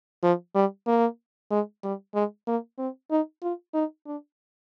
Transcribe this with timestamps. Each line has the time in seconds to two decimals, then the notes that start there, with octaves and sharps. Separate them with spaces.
0.23 F3
0.55 G3
0.87 A#3
1.51 G#3
1.84 G3
2.15 G#3
2.47 A#3
2.79 C4
3.11 D#4
3.43 F4
3.74 D#4
4.06 D4